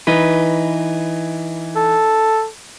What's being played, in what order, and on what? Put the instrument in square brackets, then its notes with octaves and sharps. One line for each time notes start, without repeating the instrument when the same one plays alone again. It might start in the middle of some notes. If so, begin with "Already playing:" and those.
[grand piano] E3 [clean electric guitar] D#4 B4
[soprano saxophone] A4